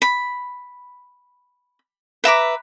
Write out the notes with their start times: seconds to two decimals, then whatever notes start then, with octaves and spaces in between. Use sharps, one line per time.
0.02 B5
2.24 B4 E5 A#5 D6